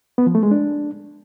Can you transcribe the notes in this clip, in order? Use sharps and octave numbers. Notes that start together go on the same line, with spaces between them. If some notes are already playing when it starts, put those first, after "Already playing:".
B3
F3
A3
G#3
D4